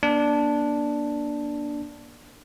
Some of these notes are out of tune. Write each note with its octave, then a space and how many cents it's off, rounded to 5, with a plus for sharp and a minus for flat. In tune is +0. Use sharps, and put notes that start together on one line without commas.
A#3 +40 D4 +0